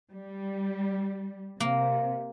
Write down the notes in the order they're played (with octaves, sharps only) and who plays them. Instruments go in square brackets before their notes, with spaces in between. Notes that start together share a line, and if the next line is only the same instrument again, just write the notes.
[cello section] G3
[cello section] C3 [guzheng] A#3